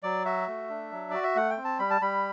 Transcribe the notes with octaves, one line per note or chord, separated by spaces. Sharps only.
F#3 D5
F#4 E5
A3
D4
F#3
F#4 D5
E5
A3 F#5
G5
C4
A5
G3 B5
A5
G3 B5